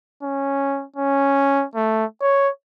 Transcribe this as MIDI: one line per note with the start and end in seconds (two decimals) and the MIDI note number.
0.23 0.85 61
0.96 1.65 61
1.75 2.05 57
2.21 2.50 73